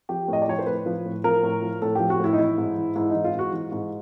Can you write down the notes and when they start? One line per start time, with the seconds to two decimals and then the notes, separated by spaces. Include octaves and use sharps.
0.09 F3 G4
0.28 A2 D#5
0.42 D5
0.48 F3 C#5
0.59 C5
0.66 A2 B4
0.86 F3
1.05 A2
1.24 F3 A#4
1.43 A2
1.62 F3
1.82 A2 A4
1.95 F3 G4
2.10 F#4
2.19 A2 E4
2.33 D#4
2.38 E3 E4
2.58 G#2
2.77 E3
2.95 G#2 E4
3.10 E3 D#4
3.24 F4
3.35 G#2 F#4
3.53 E3
3.72 G#2